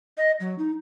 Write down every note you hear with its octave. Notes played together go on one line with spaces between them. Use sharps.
D#5
F#3
D#4